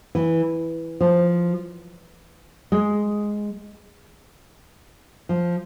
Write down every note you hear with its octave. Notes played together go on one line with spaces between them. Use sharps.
E3
F3
G#3
F3